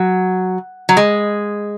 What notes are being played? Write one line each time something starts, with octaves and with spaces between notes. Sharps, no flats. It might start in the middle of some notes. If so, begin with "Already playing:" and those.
Already playing: F#3
F#3
G#3